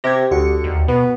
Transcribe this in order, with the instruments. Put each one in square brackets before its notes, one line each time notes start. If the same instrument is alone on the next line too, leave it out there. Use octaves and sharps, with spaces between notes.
[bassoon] C3 [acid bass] G4 [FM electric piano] G#6 A#6
[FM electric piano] D2 F#4 C#7 [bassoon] D3
[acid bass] D#2
[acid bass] B2 [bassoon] B3